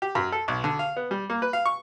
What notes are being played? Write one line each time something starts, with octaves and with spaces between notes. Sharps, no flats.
G4
F#2
A4
B1
D3
F5
B3
G3
A#3
B4
F5
C#6